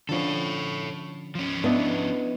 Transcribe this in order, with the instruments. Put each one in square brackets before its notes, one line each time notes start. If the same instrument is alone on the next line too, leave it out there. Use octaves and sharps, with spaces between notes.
[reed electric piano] D3 F3 C#4 [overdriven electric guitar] A4 C#5
[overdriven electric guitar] F3 C#4
[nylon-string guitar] B3 [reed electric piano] D4 E4 D#5